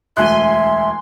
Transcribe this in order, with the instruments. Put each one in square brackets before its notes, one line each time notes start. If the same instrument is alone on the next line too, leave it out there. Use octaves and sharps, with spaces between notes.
[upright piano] E1 D2 F#6 [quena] E5 [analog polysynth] G#5 C6